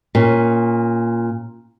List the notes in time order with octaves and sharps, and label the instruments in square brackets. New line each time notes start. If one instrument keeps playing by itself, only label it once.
[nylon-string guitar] A#2 C#4